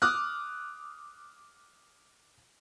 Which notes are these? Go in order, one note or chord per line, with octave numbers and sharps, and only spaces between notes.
D6 D#6 F6 F#6